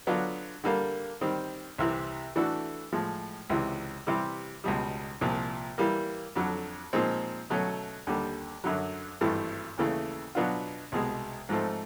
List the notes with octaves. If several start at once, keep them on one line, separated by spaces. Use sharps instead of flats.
D3 F#3 B3 D4 F4
D3 G3 A#3
D#3 G3 C4
C2 C3 E3
E3 A3 D4 F#4 A4
A2 F3 G#3
C#2 C3 E3
C3 E3 G3
C#2 B2 G3
C2 A#2 F3
E3 G3 A#3
F2 D3 F#3
A#2 F3 G#3 C4 D#4
B2 F#3 A3 C#4
D#2 D3 G3
F#2 D3 F#3
G#1 G2 E3 A3
D#2 C#3 E3 A3
B2 F#3 B3 D4 F4
C2 B2 G#3
G#2 F3 A3 C4